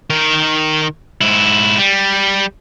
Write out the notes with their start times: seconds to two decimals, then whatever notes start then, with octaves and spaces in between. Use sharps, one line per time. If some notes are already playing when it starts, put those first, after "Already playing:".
0.10 D#3 A#4
1.21 G#2 E4
1.78 G3